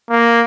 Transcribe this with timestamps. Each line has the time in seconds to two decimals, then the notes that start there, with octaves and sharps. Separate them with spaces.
0.10 A#3